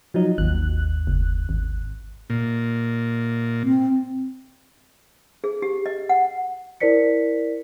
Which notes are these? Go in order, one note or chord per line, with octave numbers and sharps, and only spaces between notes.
F3 F#3 D#4
G#1 D#2 F#6
F#1
G#1
A#2
C4
G#4
G4
D#5
F#5
E4 A#4 C5 D5 B6 C#7